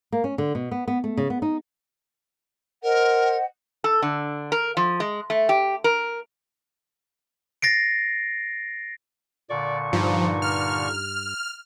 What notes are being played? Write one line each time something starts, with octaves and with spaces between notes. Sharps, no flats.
A#3
C#4
D3
B2
B3
B3
A3
C#3
B3
D#4
A#4 C5 D#5 F#5
A4
D3
A#4
F3
G#3
A3
G4
A#4
A6 A#6 C7 D7
A#2 D3 D5 C#6
G2 F3 D#4
F6